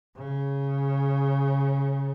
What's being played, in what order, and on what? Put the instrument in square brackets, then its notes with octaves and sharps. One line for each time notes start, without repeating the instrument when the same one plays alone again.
[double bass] C#3